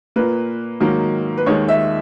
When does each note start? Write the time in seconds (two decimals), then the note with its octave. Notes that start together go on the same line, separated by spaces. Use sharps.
0.16 A#2 A#3 B4
0.80 G#2 D#3 F#3 A#3
1.37 B4
1.46 D#2 D#3 G#3 C#5
1.68 E5